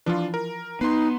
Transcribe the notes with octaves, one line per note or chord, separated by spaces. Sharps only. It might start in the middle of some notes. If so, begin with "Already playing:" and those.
E3 F3 D4 F4
A#4
B3 D#4 B4 B5 C6 C7